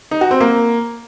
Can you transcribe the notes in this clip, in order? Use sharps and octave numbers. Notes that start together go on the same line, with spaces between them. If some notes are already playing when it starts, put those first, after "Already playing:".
D#4
F#4
C4
A#3